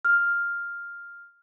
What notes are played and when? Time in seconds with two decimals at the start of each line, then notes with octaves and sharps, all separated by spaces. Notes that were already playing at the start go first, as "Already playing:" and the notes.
0.05 F6